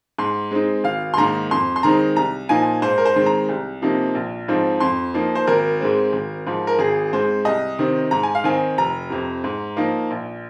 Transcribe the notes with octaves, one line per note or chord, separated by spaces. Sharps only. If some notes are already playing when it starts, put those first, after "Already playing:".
G#2 C6
G#3 C4 D#4
G#1 F5
C6
G#2 D#3 A#3 A#5
F2 C6
C6
D#3 G#3 C4 D#4 A#5
C2 A#5
A#2 F3 A#3 D#4 G#5
G#2 C5
A#4
C5
D#3 G#3 C4
A#5
C2
C3 F3 A#3 D#4
A#1
G#2 F3 C4 D#4
F2 C6
F3 A#3 D#4
C5
G#1 A#4
G#2 G#3 C4
G#1
G#2 F3
A#4
G#1 G#4
G#2 G#3 C4 C5
C2 D#5
C3 D#3 C4
G#2 A#5
G#5
F5
D#3 C4 D#4 G#5
F1 A#5
F2 C3
G#2
F3 A#3 D#4
A#1